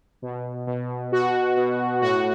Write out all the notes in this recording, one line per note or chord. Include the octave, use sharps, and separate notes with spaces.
B2
B2
B2 F#4
B2
A2 F#4